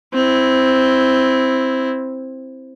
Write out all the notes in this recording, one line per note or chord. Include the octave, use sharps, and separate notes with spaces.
C4 E4